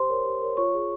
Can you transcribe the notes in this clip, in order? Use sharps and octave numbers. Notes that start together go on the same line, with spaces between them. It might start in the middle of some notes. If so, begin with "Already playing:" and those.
Already playing: G4 C5 C6
A#4 C#5
G4
A#4 C#5
F4 C#5 C#6
G#4 C#5